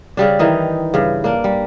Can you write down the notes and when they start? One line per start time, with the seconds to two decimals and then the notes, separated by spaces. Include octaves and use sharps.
0.17 C#3 G3 D4
0.39 D#3 E3 D#4
0.94 G2 C#3
1.24 A#3 D4
1.44 G3